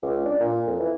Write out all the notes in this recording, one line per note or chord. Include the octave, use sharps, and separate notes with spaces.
C#2
D4
A#2
F2
E3